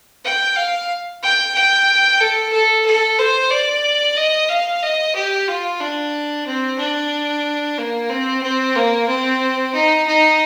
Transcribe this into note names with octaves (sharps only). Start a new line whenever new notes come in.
G5
F5
G5
G5
A4
A4
A4
C5
D5
D#5
F5
D#5
G4
F4
D4
C4
D4
A#3
C4
C4
A#3
C4
D#4
D#4